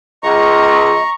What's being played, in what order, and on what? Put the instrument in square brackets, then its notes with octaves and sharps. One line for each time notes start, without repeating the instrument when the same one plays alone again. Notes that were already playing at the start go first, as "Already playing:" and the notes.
[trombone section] C#2 [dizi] D#5 [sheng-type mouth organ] A#5 C#6